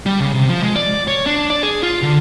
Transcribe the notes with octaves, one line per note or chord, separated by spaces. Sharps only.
G3
C#3
C3
F3
G#3
D5
C#5
D4
D5
G#4
F4
D3